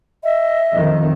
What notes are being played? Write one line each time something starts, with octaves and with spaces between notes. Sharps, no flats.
D#5 E5
F2 D#3